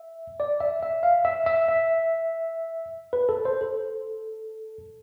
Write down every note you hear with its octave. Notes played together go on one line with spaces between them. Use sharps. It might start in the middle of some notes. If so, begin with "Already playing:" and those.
Already playing: E5
D5
E5
E5
F5
E5
E5
E5
B4
A4
C5
A4